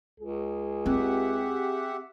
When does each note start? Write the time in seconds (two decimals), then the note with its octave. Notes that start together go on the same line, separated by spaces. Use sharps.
0.20 C#2 G#4
0.86 C4 G4 E5 F#5